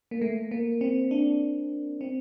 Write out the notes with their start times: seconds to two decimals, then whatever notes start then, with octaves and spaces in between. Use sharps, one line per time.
0.11 A#3
0.22 A3
0.51 A#3
0.81 C4
1.11 D4
2.01 C4